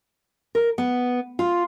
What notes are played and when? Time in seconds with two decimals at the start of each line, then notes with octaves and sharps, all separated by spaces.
0.55 A#4
0.78 B3
1.39 F4